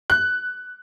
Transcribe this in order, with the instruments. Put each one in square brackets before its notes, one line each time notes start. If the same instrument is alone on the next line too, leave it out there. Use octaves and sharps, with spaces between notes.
[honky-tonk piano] F#6